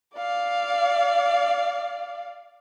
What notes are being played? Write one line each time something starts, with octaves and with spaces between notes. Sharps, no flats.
D5 F5